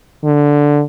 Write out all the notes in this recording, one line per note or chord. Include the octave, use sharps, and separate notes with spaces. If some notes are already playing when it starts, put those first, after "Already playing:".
D3